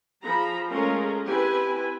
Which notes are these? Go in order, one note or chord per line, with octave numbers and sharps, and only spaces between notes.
F3 G#4 A#5 B5
G#3 A3 C#4 F4 A#4 A#5
C4 E4 G4 B4 G#5